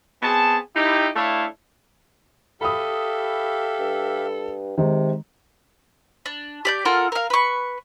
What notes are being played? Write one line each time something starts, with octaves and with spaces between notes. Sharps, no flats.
B3 C4 G#4 A5
D#4 E4 G4
A3 D4 E4 A4 C#5 F5
G4 A4 E5 F5 B5 D#6
G2
C3 D#3 G#3
D4
G4 D5 G6
F4 A4 A#4 F#5
A#4 F5
B4 C#6